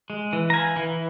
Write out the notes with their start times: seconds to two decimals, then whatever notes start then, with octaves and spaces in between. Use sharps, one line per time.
0.10 G#3
0.33 E3
0.50 A#5
0.54 E3 F5 G#5
0.76 E3